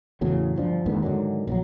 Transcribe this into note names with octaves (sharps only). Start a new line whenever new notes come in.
E2 A2 C#3 F#3
G1 F3 D4
D#2 G#2 D3 B3
G#2 D3 D#3 F#3
A#1 F3 F#3